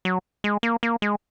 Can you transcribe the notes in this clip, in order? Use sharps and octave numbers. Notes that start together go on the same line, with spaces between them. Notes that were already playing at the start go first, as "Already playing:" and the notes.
F#3
G#3
A#3
A#3
G#3